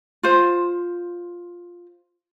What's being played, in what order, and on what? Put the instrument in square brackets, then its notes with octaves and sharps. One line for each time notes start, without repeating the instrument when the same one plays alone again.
[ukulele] F4 C5